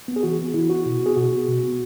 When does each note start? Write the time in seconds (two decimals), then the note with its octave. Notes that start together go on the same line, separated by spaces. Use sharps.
0.08 B3
0.16 G#4
0.23 E3 F#4
0.38 B3
0.54 E3 E4
0.70 B3 F#4
0.86 B2
1.01 B3 G#4
1.16 B2 F#4
1.32 B3
1.48 B2
1.63 B3